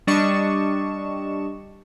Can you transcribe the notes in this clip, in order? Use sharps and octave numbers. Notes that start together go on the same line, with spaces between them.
G3 D4 D#5 C#6 E7